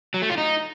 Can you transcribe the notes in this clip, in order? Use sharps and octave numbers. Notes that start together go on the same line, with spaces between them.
F#3
A3
F4
D#4